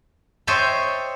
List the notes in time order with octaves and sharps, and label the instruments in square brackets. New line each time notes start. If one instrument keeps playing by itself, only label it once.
[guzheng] C5 C#5 D#5 E5 G5 A5